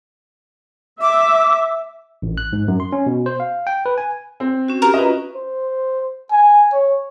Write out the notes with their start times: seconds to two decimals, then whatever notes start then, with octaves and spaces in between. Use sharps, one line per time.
1.02 E5 D6
2.22 A1
2.38 F#6
2.53 G#2
2.68 F#2
2.80 C6
2.93 C#4
3.07 B2
3.26 C5
3.40 F5
3.67 G5
3.86 B4
3.98 G#5
4.40 C4
4.68 C#4 F#4
4.82 G4 A#4 A#5
4.94 C#4 F4 F#4 B4 D#5
5.36 C5
6.32 G#5
6.73 C#5